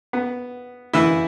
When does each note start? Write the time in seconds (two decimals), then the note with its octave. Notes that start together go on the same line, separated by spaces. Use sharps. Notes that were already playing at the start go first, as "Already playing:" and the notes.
0.13 B3
0.93 E3 E4